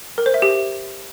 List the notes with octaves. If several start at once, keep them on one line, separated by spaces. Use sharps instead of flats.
A#4
C5
E5
G4